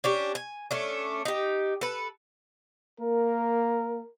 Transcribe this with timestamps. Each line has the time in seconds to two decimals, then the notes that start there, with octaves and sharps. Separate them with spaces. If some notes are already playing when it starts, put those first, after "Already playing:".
0.04 C#4 D4 G4
0.35 G#5
0.71 A3 C#4 D4
1.25 D#4 G4
1.81 A4 B4
3.00 A#3 A#4